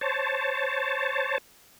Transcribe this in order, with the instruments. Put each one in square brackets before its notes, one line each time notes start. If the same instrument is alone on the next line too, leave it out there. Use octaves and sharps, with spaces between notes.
[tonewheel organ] C5 C#5 A5